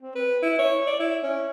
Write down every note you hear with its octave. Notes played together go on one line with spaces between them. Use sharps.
C4
B4
E4
C#5
D5
E4
C#4